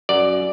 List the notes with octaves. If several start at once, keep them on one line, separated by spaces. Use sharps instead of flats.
F#2 D5